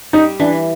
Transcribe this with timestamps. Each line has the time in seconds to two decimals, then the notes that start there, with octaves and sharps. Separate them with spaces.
0.13 G3 D#4
0.40 E3 D4